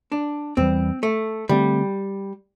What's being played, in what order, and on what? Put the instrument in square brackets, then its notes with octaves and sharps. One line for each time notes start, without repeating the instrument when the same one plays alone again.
[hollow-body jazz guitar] D4
[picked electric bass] E2 E3 G3 [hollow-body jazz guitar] C4
[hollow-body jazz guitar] A3
[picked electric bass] D3 A3 C4 [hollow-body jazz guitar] G3